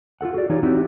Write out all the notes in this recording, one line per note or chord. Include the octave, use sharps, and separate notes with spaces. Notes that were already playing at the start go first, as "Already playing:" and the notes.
F4 F#4 A4 F#5
F#4 G#4 D5
E3 D#4 F4 G4 C#5
C4 D#4 E4 F#4 G4